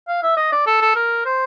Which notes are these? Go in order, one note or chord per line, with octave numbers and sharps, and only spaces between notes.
F5
E5
D#5
D5
A4
A4
A#4
C5